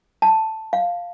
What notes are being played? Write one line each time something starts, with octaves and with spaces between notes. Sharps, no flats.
A5
F5